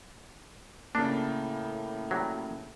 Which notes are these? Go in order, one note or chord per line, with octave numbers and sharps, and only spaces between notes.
A2 C#3 A#3 D4
F#3 G3